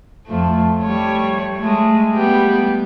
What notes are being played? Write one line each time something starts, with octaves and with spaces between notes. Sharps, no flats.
F2 F3 A3
G3 A3 C#5
G#3 A3
G3 B3 G4